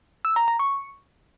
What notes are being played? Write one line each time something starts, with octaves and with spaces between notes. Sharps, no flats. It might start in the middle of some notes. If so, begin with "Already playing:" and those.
E6
A#5
A#5
C#6